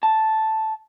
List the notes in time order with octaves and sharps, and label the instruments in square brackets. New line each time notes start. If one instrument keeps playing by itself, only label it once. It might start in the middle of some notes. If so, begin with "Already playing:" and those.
[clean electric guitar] A5